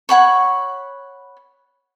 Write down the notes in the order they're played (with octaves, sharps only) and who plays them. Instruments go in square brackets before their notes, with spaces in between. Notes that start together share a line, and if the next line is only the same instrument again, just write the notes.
[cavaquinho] C#5 F#5 B5 C#6